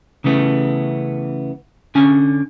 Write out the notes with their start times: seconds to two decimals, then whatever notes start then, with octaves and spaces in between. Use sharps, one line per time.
0.24 C#3 E3 A3 B3
1.95 D3 C#4 G#5